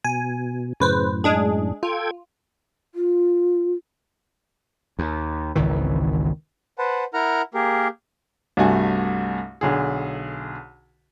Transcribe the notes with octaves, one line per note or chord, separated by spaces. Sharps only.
B2 G#5
F#2 A2 C#3 B4 C5
G#3 D4 G#4
F4 A4 G5 G#6
F4
D#2
G#1 C#2 D#3 E3
B4 C5 F#5 A5
E4 A#4 F#5 A#5 F6
A#3 G4 G#4 A#4
C2 G2 A3 F#4 G#5
B1 D3 G#4